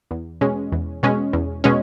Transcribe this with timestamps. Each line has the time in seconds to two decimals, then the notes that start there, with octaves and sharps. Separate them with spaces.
0.11 E2
0.41 B2 G#3 C#4
0.72 E2
1.03 B2 G#3 C#4
1.33 E2
1.64 B2 G#3 C#4